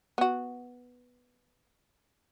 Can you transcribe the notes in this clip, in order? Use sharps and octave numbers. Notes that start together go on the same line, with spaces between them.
B3 F#4